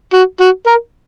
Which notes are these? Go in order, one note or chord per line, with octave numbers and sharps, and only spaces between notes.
F#4
F#4
A#4